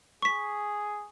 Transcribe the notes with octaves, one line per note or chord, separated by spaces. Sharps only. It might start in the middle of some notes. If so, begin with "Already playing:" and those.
G#4 C#6 B6